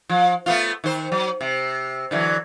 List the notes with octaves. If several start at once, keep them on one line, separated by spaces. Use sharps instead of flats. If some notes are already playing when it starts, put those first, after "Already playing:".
F3
A3 B3 F4
D#3 C5
F#3
C3
D3 E3 F#3